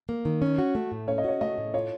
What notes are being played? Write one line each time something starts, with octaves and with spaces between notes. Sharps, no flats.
A#3
D#3
C#4
F#4
A3
A2
C#4 C#5
D#5
F#4 C#5
A3 D#5
A2
F4 C#5